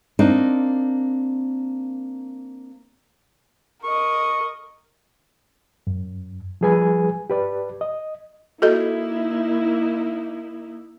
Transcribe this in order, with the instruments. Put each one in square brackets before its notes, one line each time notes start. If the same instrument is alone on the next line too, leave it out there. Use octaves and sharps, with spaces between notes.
[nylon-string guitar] A#3 C4 D4 D#4
[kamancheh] A#4 D#5 [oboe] C#6
[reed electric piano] F#2
F3 G3 G#4 B4 G#5
G4 B4 D5
D#5
[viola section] A#3 D#4 E4 [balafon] F#4 A4 D#5